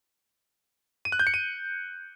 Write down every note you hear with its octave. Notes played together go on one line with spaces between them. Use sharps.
D#7
F#6
G6
C#7
D#7